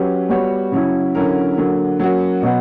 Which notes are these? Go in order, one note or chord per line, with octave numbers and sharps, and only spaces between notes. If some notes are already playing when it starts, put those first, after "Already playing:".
Already playing: F#3 C#4 G4 B4
G3 B3 F#4 C#5
C#3 F#3 C#4 E4
D3 F#3 C#4 E4 A#4
D3 F#3 A#3
F#3 A#3 C#4 F#4
B2 F#3 B3 F#4